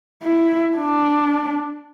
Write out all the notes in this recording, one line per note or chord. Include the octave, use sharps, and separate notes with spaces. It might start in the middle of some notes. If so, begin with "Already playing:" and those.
E4
D4